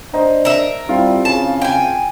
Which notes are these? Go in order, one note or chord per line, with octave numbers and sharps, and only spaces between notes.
D4 C5 D#5 A#5
A#4 E5
G3 C4 E4 F4
C#3 A5
G5 G#5